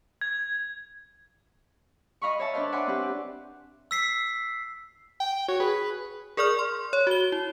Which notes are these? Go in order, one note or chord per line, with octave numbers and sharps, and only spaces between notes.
G#6
D#5 F5 B5 C#6
C#5 E5 A5
D4 B4 C5 F5
D5 E5 F#5 G#5 B5 C6
C4 E4 G4 B4
E6 B6 C7
G5
F#4 C#5
G#4 B4
G#4 A#4 D5 C#6 F6
C6
C#5
F#4 G7
E4